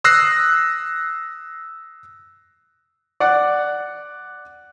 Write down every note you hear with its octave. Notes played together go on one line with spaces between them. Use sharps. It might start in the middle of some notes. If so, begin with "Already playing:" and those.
D#6 E6 F#6 A#6 C7
D5 F#5